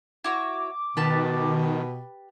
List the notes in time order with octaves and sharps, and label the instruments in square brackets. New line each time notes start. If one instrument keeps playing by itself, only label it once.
[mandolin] E4 F#4 C#5 [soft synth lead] D6
[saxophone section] B2 [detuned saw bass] D#3 [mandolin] G4 B4 A5